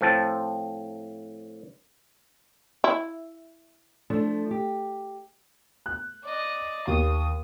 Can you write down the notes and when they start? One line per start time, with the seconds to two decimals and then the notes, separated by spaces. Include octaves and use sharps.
0.01 A2 F3 C4 A5
2.84 E4
4.10 F3 A3 D4
4.51 G4
5.86 F#6
6.24 D5 D#5
6.87 D#2 D#6